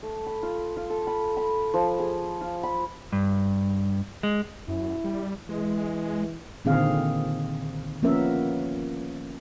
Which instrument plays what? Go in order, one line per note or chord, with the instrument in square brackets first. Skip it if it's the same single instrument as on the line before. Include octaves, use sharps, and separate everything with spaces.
[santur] A3
B5
F4
F4
A4
B5
B5
F3
G#4
F4
B5
[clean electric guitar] G2
G#3
[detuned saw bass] F#2 [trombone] E4
[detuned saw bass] G3
[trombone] E3 [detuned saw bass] G#3
[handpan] A#2 D3 D#3 C4 G#4 F5
F3 A#3 B3 C#4 A#4 E5